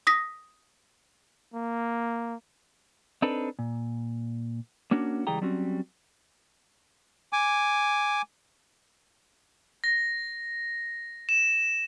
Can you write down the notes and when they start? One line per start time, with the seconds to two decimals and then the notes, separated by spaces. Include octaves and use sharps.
0.07 D#6 A#6 B6
1.54 A#3
3.22 C4 D4 D#4 A4 B4
3.59 A#2
4.91 A#3 C#4 D4 F#4
5.27 C#2 E3 G3 G#4 G5 A#5
5.41 F#3 G3 C4 C#4 F#4
7.33 G#5 D6
9.84 A#6
11.29 E7